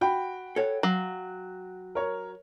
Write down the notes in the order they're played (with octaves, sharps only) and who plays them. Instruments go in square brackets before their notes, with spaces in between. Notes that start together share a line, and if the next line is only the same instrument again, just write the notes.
[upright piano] F#4 G5 B5
[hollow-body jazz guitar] A4 C#5 F#5
[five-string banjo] F#3 [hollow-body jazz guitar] F5
[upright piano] A#4 C#5